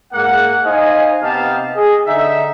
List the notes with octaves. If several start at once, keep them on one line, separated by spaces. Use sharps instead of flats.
G#2 G#3 A#3 F#5
D#4 C5 D#5 F5 G#5
C3 B3 D#4 G4 F5 A5
G#4 D#5
D3 D#4 E5